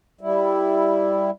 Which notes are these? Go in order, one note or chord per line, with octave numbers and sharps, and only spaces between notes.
G3 E4